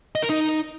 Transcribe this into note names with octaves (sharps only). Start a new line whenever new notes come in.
D#5
A#4
D#4